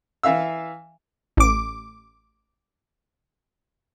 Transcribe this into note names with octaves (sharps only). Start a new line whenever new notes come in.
E3 E5 F5 E6
A1 D6